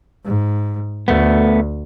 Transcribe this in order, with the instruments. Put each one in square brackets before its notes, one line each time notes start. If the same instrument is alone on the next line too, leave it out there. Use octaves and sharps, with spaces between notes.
[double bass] G#2
[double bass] D2 [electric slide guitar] A3 B3